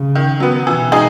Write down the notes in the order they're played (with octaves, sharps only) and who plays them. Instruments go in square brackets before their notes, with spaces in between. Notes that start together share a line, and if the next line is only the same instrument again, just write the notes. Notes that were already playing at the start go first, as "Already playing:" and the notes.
Already playing: [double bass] C#3
[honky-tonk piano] D#3
F#3 B3
[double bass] B2 [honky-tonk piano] E3
[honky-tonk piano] G#3 D#4 G#4